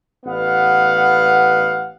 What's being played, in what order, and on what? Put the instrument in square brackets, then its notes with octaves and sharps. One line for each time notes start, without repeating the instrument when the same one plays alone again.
[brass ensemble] A1 B3 F5 F#5